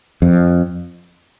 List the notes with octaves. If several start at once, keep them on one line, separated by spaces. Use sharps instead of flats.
F2